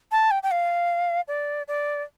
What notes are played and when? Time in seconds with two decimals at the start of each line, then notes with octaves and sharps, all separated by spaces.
0.12 A5
0.31 G5
0.43 G5
0.51 F5
1.28 D5
1.68 D5